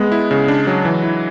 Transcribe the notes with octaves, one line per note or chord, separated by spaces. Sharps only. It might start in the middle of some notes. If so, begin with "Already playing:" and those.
Already playing: G#3 B3
E4
C#3
D4
F#3
E3
E4